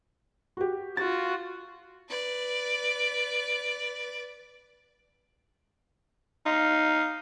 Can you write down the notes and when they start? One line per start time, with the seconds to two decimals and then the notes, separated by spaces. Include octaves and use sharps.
0.57 F#4 G4
0.97 F4 F#4 A6
2.09 B4 D5
6.46 D#4 F5